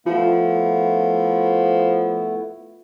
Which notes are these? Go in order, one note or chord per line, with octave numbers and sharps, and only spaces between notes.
F3 A3 B3 E4 F4